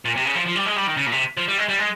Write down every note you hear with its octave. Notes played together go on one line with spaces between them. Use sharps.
A#2
C3
C#3
F3
F3
G3
G#3
G3
D#3
C#3
A#2
C3
F3
G3
G#3
G3
G#3